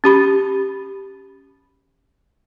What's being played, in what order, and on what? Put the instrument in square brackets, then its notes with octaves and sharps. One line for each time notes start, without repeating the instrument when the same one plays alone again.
[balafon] C#4 G4 B5